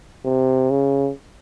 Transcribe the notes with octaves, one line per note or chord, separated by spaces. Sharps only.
C3
C#3